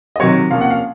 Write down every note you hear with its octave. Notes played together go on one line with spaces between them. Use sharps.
D#5
C3 D#3 F#3 C4 C#5
C3 F3 A#3 C#4 F5
F#5
F5